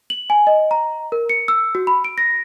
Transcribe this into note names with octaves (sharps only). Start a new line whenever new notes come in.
F#7
G#5
D#5
A#5
A#4
C#7
E6
F#4
B5
D7
A#6